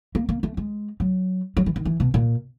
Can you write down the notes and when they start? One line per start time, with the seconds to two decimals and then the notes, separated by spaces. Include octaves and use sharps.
0.15 A#3
0.29 A#3
0.43 A3
0.57 G#3
1.00 F#3
1.57 F#3
1.66 E3
1.76 D#3
1.85 E3
2.00 B2
2.14 A#2